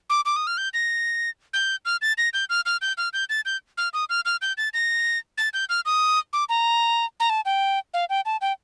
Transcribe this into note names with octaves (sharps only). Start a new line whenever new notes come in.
D6
D6
D#6
F6
G6
A#6
G6
F6
A6
A#6
G6
F6
F6
G6
F6
G6
A6
G6
F6
D#6
F6
F6
G6
A6
A#6
A6
G6
F6
D#6
D6
A#5
A#5
A5
G5
F5
G5
A5
G5